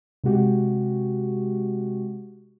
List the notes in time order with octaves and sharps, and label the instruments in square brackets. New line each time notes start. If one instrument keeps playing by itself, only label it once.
[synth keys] C3 G#3 F#4 G4